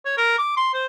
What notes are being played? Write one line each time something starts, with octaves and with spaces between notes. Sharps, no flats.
C#5
A#4
D6
C6
C5